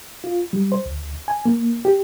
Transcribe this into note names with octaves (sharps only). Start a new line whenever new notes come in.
F4
G3
C5
D2
G#5
A#3
G4